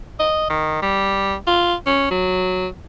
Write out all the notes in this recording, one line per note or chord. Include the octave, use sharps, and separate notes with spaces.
D#5
D#3
G3
F4
C#4
F#3